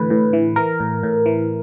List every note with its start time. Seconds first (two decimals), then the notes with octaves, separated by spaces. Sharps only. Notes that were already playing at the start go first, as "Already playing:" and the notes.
Already playing: A2 D3 E3 B4
0.10 A2
0.33 E3
0.56 E3 A#4
0.80 A2
1.03 A2
1.26 E3